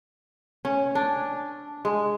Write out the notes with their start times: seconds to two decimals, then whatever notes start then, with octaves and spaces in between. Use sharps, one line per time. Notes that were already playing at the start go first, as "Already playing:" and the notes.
0.65 C#4
0.95 D4
1.85 G#3